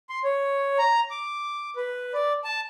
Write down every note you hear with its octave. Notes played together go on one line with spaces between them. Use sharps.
C6
C#5
A#5
D6
B4
D5
A5